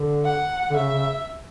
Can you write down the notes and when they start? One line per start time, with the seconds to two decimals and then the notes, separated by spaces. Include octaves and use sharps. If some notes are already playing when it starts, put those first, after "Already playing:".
Already playing: D3
0.25 F#5
0.70 D3
0.76 C#3 E5
0.93 C#3